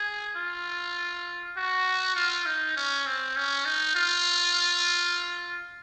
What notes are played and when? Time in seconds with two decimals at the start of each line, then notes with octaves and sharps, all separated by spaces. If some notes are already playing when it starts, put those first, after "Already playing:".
Already playing: G#4
0.37 F4
1.57 F#4
2.16 F4
2.46 D#4
2.76 C#4
3.06 C4
3.36 C#4
3.65 D#4
3.95 F4